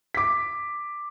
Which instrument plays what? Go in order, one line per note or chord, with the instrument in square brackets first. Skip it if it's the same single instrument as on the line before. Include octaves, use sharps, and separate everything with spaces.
[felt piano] D6 B6